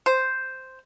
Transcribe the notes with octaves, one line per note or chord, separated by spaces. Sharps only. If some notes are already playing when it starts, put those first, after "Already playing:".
C5